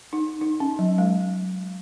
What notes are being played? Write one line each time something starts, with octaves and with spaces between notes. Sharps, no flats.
D#4
D#4
C#4
F#3
G#3